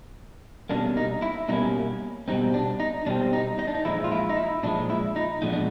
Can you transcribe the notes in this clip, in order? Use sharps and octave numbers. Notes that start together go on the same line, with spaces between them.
B2 G3 A#3 C#4 D4
D#4
E4
B2 G3 A#3 C#4 D#4
B2 G3 C4 D#4
D4
D#4
B2 G3 C4 D4
D#4
D#4
D4
D#4
A#2 F3 G#3 E4
F4
E4
D#4
E4
A#2 F3 G#3 D4
E4
D#4
A#2 F3 G#3 B3 D4 D#4
D4